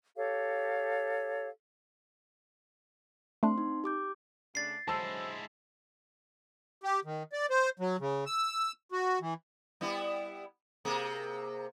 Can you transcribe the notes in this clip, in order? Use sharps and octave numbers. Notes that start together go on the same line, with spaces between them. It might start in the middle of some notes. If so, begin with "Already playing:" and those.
G4 A4 C#5 F5
A3 C4 D4 C6
D#4
G4 D6 G6
C#3 A3 D4 A6 C7
D3 F#3 G#3 E4 C5 A5 E6
G4
D#3
D5
C5
F#3
C#3
E6
F#4
E3
G3 B3 E4
C3 A#3 G#4